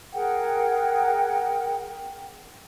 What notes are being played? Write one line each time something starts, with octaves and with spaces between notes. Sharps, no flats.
G#4 A#4 F#5 G5